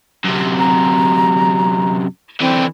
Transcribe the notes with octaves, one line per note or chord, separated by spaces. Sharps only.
F#2 C3
A#5
D3 E3 C4